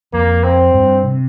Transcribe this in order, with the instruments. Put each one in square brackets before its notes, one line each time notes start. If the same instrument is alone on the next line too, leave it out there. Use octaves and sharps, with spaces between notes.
[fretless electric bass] F2 [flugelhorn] A#3
[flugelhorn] C4
[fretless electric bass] G2
C3